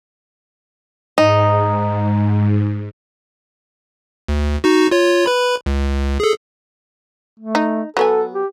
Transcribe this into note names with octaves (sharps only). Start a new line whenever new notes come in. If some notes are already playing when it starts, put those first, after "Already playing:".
G#2 D#4
D2
D#4 F#4
F4 C#5
B4 B5
C#2
G#4 A4
A3
D#4
F#3 B3 A4 G#5
G4